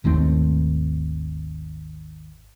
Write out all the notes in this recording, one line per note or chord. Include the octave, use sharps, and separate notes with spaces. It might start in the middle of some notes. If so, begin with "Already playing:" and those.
G#1 D#2 A3 C4